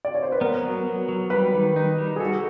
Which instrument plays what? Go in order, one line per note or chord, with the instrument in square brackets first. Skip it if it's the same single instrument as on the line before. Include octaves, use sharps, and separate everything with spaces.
[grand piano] D5
C#5
C5
B4
[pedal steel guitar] B3 [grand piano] A#4
[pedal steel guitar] F#3
B3
F#3
[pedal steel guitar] G3 [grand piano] B4
[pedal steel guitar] D#3
D#4
G3
[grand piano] G#4
[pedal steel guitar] F#4 [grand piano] A4